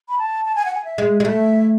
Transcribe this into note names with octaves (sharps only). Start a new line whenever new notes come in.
B5
A5
A5
G#5
F#5
G#5
E5
G#3
G#3 D5
A3 E5